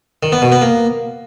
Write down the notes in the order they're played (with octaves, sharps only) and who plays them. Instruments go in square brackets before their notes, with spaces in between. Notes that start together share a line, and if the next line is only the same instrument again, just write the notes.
[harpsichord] D#3
B3
B2
B3
A#3